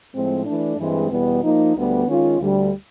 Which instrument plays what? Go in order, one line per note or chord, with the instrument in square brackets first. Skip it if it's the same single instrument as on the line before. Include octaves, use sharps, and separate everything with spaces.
[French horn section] A2 F3 G#3 C4
E3 A3 D4
G2 E3 G#3 C4
E2 B2 G3 B3
F3 A#3 D#4
D2 D3 G3 B3
D#3 G#3 C#4 F4
D2 D3 G3